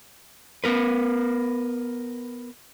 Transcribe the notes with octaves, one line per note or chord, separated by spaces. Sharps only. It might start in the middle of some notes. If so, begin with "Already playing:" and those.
B3 A#4 B4